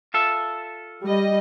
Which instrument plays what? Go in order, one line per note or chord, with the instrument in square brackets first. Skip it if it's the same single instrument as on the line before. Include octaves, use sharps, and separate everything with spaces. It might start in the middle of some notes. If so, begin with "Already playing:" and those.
[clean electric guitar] F4 A4 E5
[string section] G3 D#5